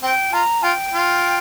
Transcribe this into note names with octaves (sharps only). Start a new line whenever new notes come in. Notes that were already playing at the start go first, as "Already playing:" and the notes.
C4 G5
F4 A#5
F4 G5
F4